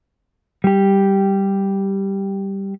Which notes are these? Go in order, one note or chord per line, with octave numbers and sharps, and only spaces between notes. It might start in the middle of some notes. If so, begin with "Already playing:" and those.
G3 G4